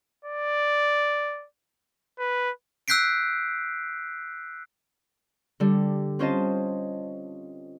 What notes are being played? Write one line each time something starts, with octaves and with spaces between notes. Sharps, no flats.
D5
B4
E6 F#6 G6 B6 C7 D7
D3 G3
C4 C#4 F4 C5 D#5 A5